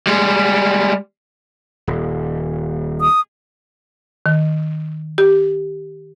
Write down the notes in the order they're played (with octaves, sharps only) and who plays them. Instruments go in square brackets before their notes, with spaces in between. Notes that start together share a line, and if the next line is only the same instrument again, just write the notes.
[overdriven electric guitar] G3 G#3
[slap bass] D#1
[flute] D#6
[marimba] D#3
G4